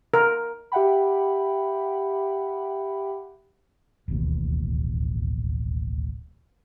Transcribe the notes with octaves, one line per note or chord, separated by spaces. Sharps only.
A#4
G4 E5 F#5 G5 B5
D1 A1 D#2 B2